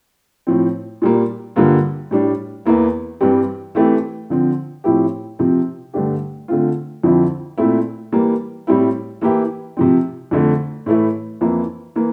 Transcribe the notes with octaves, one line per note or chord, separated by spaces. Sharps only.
A2 F3 C4
A#2 G3 A#3
G2 D3 G3 A#3 F4
A2 G3 D4
E2 E3 A#3 E4
G2 E3 G3 C4 G4
E3 A3 C4 E4 G4
D3 F3 C4
A2 F3 C4 E4 G4
C3 F3 C4
G2 D3 A3 D4 G4
D3 A3 C4 F4
F2 D3 F3 C4 E4
A#2 A3 C4 E4
E3 G3 A#3
A2 G3 C4 E4
E3 A#3 E4 G4
C3 F3 C4
F2 D3 A3
A2 E3 A3 E4
F2 E3 A#3 E4
E3 A#3